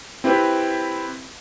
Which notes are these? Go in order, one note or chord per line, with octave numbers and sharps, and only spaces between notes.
C4 E4 G4 B4